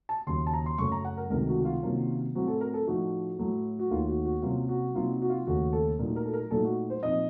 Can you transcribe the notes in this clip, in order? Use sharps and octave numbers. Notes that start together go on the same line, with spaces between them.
A5
D#2 C#3 F#3 C6
A5
A#5
C6
F#2 C#3 A3 C#4 C#6
A#5
F#5
A#4
C#2 C3 D#3 F#3 A3 A#4
F#4
F#4
F4
C3 D#3 F#3 A#3 C#4
A2 F#3 C4 F#4
A4
A#4
A4
A2 F3 A3 D#4 F#4
A2 F#3 A3
F#4
D#2 D#3 A3 D#4 F4
F#4
F#4
C3 F#3 A#3 C#4 F4
F#4
C3 F#3 A#3 D#4 F4
F#4
F4
D#2 C#3 A3 F#4
A4
A#2 F#3 A3 D#4 A#4
A#4
A4
A#4
A#2 F#3 A3 D#4 A4
F#4
C5
A#2 F3 C4 D#4 D#5